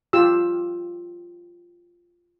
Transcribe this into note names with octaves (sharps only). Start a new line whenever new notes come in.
F4 G4 E6